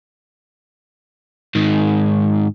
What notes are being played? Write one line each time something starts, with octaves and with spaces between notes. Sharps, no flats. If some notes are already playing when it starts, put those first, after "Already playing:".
G#2 D#3